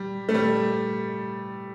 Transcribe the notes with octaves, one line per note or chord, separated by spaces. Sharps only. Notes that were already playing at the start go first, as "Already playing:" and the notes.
Already playing: G3
A3
G3